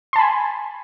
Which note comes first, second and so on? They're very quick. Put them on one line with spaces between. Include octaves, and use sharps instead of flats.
C6 A5 B5 G#5